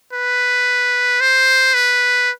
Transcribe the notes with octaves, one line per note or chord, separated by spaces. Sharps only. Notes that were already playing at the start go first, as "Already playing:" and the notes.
B4
C5
B4